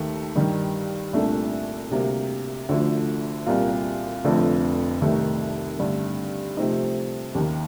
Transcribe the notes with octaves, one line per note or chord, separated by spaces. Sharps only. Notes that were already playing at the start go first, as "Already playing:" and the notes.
Already playing: D#2 D#3 A3
G2 D#3 G3
C2 A#2 A3 D4 A4
D2 C3 G3 A#3
D2 D3 F3 A3
C2 A#2 G3 A#3 F4
F1 F2 D3 A3
C2 C3 D#3 A3
G2 D3 A3
C3 F3 A3 C4 D#4
D#2 D#3 A#3